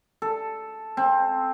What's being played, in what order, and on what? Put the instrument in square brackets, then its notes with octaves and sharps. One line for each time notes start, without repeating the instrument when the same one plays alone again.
[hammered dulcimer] A4
C4